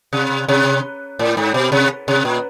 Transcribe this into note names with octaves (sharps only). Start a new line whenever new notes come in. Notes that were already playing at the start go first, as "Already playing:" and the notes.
C3
C3
A2
G#2
B2
C3
C3
A#2